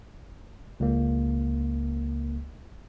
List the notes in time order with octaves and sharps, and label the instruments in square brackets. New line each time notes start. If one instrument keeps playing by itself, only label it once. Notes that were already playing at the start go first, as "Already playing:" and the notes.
[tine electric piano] C#2 A#3